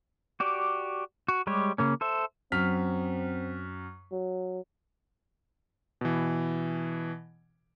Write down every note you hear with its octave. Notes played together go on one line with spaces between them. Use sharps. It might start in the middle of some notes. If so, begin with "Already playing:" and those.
F#4 G4 D5
F#4
G3 G#3 G4 C#5
C#3 A#3 C#4
A4 C5 E5
F#2 C4 F6 B6
F#3
B2 E3